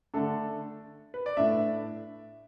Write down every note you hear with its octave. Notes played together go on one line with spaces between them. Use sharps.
D3 A3 D4 A4
B4
D5
A2 A3 D4 E5